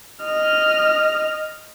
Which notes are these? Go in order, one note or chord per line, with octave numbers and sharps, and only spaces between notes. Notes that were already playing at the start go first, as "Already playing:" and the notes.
D#5 F6